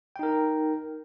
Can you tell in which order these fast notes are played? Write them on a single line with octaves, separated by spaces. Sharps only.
G5 D#4 A#4